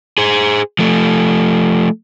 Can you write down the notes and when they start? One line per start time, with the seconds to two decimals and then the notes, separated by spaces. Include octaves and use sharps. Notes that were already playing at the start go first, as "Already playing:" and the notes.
0.18 G#4 C5
0.79 F3 A3